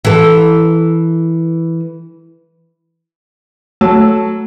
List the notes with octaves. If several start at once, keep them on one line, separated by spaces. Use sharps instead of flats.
E3 A4
F#3 A3